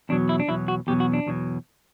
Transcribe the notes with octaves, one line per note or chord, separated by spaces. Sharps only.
E2 B2 F#3 D4
E4
D4
E2 B2 F#3 E4
F#4
E2 B2 F#3 G4
F#4
D4
E2 B2 F#3